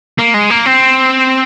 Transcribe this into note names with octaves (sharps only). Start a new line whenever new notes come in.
A#3
G#3
A#3
C4